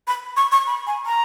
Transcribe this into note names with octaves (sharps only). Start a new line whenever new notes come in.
B5
C#6
C#6
B5
G#5
A#5